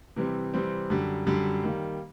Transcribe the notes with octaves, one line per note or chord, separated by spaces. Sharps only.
C3 E3 G3 C4
C3 E3 G3 C4
F#2 D3 G3
F#2 D3 G3
D#3 G3 A#3